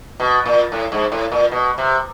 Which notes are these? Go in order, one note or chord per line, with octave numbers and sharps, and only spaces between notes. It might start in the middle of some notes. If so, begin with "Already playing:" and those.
B2
A#2
A2
G#2
A2
A#2
B2
C3